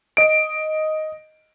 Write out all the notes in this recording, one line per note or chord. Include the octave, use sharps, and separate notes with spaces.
D#5 D7